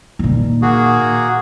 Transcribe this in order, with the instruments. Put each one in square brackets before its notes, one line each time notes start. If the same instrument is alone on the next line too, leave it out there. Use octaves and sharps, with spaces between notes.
[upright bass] A#2 D#3
[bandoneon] A#3 F#4 G#4